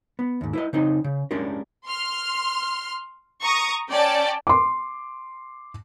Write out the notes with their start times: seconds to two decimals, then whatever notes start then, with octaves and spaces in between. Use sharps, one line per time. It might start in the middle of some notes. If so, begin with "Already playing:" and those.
0.19 B3
0.41 D#2 G#2
0.53 E4 B4 D#5
0.73 C#3 C4 D#4 D#5
1.04 C#3
1.31 G#3 C#4 D4 G4 A#4
1.86 C6 F6
3.42 A#5 C#6 D#6
3.90 C#4 D5 G5 A5
4.47 C6 D6